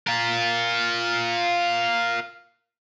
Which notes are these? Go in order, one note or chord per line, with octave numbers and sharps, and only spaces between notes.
F4 A#4